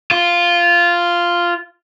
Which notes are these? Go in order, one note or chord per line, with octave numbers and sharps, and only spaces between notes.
F4